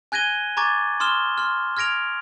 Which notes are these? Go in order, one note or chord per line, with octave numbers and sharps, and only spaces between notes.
G#5 F#6 G#6 A#6 D#7 G7
G#5 A#5 C#6 D6 G#6 A6
C6 D#6 F6 E7 G7
C6 F6
F6 G#6 A#6 D7 F7